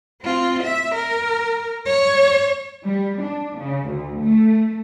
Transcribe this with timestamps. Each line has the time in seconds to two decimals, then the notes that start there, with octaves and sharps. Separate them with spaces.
0.22 C4 F4
0.63 E5
0.95 A#4
1.86 C#5
2.86 G3
3.25 D4
3.60 C#3
3.90 D2
4.24 A3